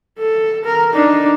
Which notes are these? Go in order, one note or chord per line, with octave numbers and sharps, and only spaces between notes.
A4
A#4
D4 D#4